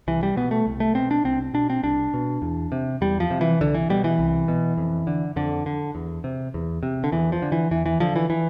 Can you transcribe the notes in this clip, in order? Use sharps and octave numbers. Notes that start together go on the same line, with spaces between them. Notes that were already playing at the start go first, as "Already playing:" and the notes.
C2 E3
G3
B2 B3
A3
C2
A3
B2 C4
D4
C2 C4
B2 D4
C4
C2 D4
B2
E2
C3
E2 G3
F3
C3
E3
C2 D3
E3
B2 G3
E3
C2
B2
F2
D3
F2 D3
D3
E2
C3
E2
C3
D3
E2 E3
F3
D3
E3
E2 E3
E3
D3 F3
E3
E3